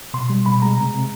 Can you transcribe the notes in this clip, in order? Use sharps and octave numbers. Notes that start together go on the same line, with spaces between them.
B2 C6
G3
B2 B5
G#3 A#5
C3
C3